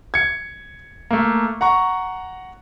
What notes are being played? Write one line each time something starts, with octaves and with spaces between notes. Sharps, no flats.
G#6 C#7
A3 A#3
F#5 A#5 C#6